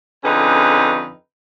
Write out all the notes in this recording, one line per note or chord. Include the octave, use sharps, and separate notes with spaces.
F2 D3 C#4 D#4 G#4 B4